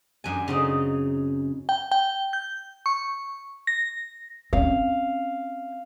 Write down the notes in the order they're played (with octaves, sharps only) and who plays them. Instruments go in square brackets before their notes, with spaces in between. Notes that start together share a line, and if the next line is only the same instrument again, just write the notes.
[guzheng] F#2 D4 G#5
C#3 C4 D#4
[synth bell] G5
G5
G6
C#6
A#6
[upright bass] C4 C#4 [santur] F5